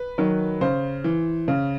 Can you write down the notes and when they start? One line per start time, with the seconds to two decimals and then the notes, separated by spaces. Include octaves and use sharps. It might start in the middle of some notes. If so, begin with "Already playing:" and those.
Already playing: B4
0.18 D#3 F#3
0.61 C#3 C5
1.04 E3
1.48 C#3